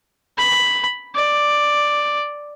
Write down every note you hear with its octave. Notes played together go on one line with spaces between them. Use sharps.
B5
D5